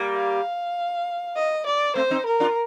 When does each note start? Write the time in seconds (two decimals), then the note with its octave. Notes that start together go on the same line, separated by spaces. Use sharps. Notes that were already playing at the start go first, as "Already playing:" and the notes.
Already playing: G3 A#3
0.15 F5
1.36 D#5
1.66 D5
1.95 A3 C4 C5
2.11 C4 D#4
2.26 A#4
2.40 D4 F4